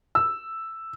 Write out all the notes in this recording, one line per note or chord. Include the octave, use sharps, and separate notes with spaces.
E6